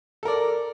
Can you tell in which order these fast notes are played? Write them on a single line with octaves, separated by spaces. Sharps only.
A4 A#4 D5